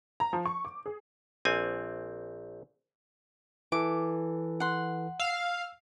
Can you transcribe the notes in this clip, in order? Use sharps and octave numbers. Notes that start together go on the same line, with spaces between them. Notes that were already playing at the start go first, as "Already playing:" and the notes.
A#5
F3
C#6
D6
G#4
A#1 C4 G#5
E3 A4 D6
F#5 C6
F5 E6